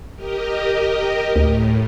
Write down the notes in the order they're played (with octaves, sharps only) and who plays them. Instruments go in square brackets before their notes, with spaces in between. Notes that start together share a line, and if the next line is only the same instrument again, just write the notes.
[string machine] G4 A#4 D#5
[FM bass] D2 [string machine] A2